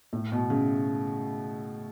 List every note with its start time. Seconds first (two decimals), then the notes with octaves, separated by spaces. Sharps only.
0.13 A2
0.32 B2
0.50 C#3